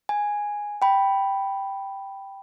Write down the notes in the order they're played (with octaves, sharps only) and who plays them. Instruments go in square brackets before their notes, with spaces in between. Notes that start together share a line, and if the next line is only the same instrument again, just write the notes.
[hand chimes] G#5
G5 B5